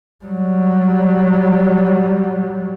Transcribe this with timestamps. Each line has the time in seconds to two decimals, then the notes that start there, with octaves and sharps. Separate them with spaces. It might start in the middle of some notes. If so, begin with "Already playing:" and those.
0.25 F#3 G3